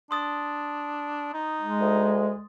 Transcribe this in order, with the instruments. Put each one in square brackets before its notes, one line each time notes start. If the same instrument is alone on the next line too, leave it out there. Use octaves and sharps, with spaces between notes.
[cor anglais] D4 [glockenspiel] C6 D#6 A6
[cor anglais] D#4
[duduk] G#3
[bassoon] D2